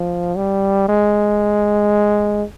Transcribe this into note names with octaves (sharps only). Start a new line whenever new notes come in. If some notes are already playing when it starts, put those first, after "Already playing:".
Already playing: F3
G3
G#3